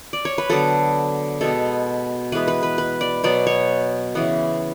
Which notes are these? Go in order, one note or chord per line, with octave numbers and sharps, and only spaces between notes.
D5
C#5
B4
D3 F#3 B3 A4
B2 G#3 B3 A4
E3 G#3 B3 B4
B4
B4
B4
D5
B2 F#3 B3 D5
C#5
C#3 E3 B3